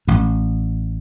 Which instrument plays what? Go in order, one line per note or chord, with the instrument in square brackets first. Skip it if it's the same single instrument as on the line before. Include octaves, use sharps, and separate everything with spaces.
[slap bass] A1 A2